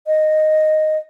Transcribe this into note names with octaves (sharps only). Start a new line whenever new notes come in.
D#5